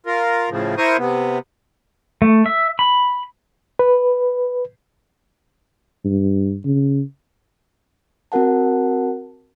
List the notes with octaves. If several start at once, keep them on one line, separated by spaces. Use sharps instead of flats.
F4 A#4
A2 C#3 F3
E4 A#4 C5 C#6 D#6
C3 B3
A3
E5
B5
B4
G2
C#3
C4 F#4 A#4 F#5 A5